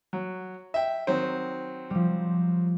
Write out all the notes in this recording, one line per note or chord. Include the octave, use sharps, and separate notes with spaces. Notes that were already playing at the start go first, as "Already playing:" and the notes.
F#3
E5 G5
D#3 F#3 C4
F3 G3